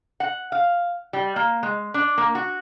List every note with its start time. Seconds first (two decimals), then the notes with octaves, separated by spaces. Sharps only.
0.20 F#5
0.52 F5
1.13 G3
1.36 A#3
1.63 G#3
1.94 D4
2.18 A#3
2.35 F#4